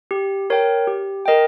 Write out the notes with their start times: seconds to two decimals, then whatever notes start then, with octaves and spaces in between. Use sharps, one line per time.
0.11 G4
0.50 A#4 C#5 G5
0.87 G4
1.26 A#4 D#5 G5